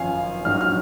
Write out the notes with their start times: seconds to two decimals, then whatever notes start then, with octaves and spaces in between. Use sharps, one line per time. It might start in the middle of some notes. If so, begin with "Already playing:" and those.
Already playing: G#1 F#2 F3 F5 G#5
0.45 A#1 G#2 F#3 F6
0.61 F6